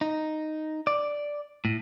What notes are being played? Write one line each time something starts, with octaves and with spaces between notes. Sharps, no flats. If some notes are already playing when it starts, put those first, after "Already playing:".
D#4
D5
A2